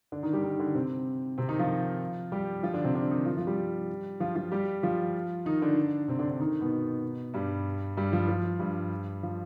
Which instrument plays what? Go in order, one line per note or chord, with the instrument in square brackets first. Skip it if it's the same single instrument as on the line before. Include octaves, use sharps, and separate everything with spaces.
[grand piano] D3 D4
D#3 D#4
G3 G4
D#3 D#4
D3 D4
C3 C4
C3 C4
D#3 D#4
F3 F4
G3 G4
F3 F4
D3 D4
C3 C4
D3 D4
D#3 D#4
F3 F4
F3 F4
G3 G4
F3 F4
F3 F4
G3 G4
F3 F4
D#3 D#4
D3 D4
C3 C4
D3 D4
D3 D4
D#3 D#4
B2 B3
G2 G3
G2 G3
F3
F3
G2 G3
F3